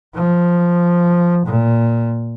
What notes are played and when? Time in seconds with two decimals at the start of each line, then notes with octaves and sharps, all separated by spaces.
0.15 F3
1.46 A#2